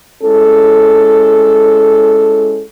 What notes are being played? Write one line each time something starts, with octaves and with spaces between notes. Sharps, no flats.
G#3 C#4 E4 A4